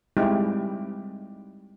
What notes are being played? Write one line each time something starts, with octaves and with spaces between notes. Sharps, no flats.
G3 G#3 C4 D#4 E4 G4